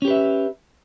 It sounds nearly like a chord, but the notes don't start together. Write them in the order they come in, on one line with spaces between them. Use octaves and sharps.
C#4 G4 B4 E5